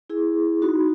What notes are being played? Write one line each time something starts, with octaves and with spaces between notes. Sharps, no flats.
E4 G#4
D#4 F#4